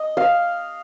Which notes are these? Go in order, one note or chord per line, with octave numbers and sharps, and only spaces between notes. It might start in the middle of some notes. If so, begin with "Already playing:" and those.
Already playing: D#5
F5